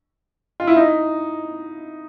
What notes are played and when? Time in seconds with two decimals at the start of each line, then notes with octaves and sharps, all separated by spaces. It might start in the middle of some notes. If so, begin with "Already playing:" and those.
0.60 F4
0.67 E4
0.76 D#4